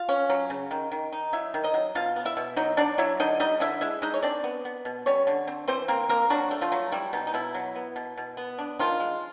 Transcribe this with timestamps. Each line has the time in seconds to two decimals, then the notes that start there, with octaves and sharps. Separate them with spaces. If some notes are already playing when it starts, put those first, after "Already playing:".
Already playing: F4 F5
0.09 C#4
0.30 F#3
0.50 C#3
0.71 D#3
0.92 D#3
1.12 D#4
1.33 F#3 E4 E5
1.54 D#3
1.64 D#4 D#5
1.74 F#3
1.95 B2 F4 F5
2.16 B3
2.25 E4 E5
2.37 B2
2.57 F#3 D#4 D#5
2.77 F#3 D4 D5
2.98 F#3 E4 E5
3.20 D3 D#4 D#5
3.40 G3 D#4 D#5
3.60 D3 E4 E5
3.81 G#3 E4 E5
4.02 G#3 D#4 D#5
4.14 C#5
4.23 C4 D4 D5
4.44 B3
4.65 B3
4.85 B2
5.06 G3 C#4 C#5
5.27 D3
5.48 C4
5.68 E3 C4 C5
5.88 A#3 C4 A#4
6.09 A#3 C4 A#4
6.30 F#3 D4 F#4
6.51 A3
6.61 F3 F4
6.72 F#3
6.92 G3 E4
7.13 B2 D#4
7.27 D#4
7.34 B2 E4
7.55 F#3
7.75 B3
7.96 B2
8.17 B2
8.37 B3
8.59 D4
8.79 D#3 F3 F4
9.00 G#3